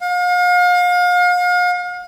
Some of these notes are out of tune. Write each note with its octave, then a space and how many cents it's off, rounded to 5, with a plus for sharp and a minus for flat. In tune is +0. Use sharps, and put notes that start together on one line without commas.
F5 +40